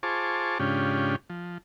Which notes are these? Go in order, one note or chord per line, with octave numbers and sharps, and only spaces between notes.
F4 G#4 C5 A5 C#6 D6
G#2 C#3 C#4 D4 F4 G4
F3